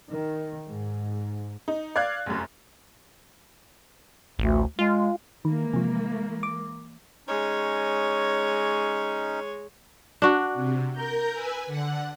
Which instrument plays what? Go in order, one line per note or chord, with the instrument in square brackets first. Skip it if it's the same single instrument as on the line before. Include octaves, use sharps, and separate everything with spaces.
[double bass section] D#3
G#2
[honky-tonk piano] D#4
D5 F5 F#6 G#6
F1 F#2
[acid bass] A1 [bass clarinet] D2
[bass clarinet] G#3 [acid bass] F4
[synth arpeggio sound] D#3 [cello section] E3 G#3 A#3
[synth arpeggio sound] C3 F3
D6
[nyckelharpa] G#3 C#5 [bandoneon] C#4 D#4
[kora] D4 F#4
[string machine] C3
A#4 A#5 G6
B4 G#5 E6
D3 F#5